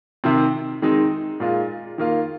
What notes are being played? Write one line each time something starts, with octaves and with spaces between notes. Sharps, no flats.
C3 D#3 C4
D#3 G#3 C4 D#4
A#2 G#3 F4
D#3 A#3 F4